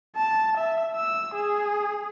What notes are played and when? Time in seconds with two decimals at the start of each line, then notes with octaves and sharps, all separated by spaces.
0.17 A5
0.58 E5
0.95 E6
1.35 G#4